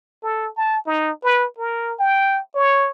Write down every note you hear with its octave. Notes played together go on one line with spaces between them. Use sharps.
A4
A5
D#4
B4
A#4
G5
C#5